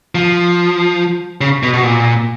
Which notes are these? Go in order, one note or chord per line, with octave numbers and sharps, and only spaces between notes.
F3
C#3
B2
B2
A#2